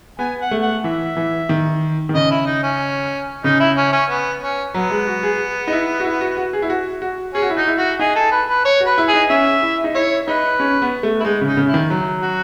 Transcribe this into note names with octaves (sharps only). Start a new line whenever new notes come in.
B3 G#5
F#5
A3
F#5
E3 E5
E3
D#3
D#3
C#3 D#5
E4
D#4
C#4
C#3 D#4
E4
C#4
C#4
B3
C#4
F#3 B3
G#3
F#4
G#4
D#4
E4
F#4
E4
F#4
F#4
G#4
E4
F#4
F#4
C#4 G#4
F#4
E4
D#4 F#4
E4
F#4
D#4 G#4
A4
B4
B4
C#5
F#4
B4
E4
G#4
D#4
C#4 E5
E4
D#4
E4 C#5
D#4 B4
C#4
B3
A3
E4
G#3 D#4
C#3
D#4
C#3
E4
D#3
F#3
F#4